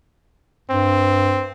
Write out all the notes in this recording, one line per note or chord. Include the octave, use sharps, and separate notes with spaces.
G2 C4